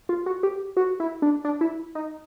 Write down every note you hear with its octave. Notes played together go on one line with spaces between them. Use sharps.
F4
F#4
G4
F#4
E4
D4
D4
E4
D#4